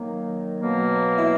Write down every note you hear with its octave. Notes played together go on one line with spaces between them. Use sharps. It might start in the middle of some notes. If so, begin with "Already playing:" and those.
Already playing: D#3 F#3 A#3
B2 F#3 A#3
E4